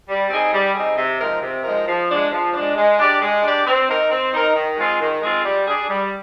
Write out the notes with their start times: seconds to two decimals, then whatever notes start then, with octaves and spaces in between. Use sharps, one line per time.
0.08 G3
0.30 C4 D#4 G#4
0.53 G3
0.75 C4 D#4 G#4
0.97 C3
1.19 F3 G#3 D#4 A#4
1.42 C3
1.64 F3 G#3 D#4 A#4
1.87 F3
2.09 G#3 D4
2.31 F3
2.54 G#3 D4
2.76 G#3
2.99 D4 G4 D5
3.21 G#3
3.43 D4 G4 D5
3.65 C4
3.88 D#4 A#4
4.11 C4
4.32 D#4 A#4
4.55 D#3
4.77 G#3 C4 F4 G#4
5.00 D#3
5.21 G#3 C4 F4 G#4
5.44 G3
5.67 D4 G#4
5.89 G3